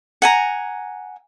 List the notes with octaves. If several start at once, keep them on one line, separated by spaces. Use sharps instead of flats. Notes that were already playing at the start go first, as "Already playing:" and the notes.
F#5 G#5 A#5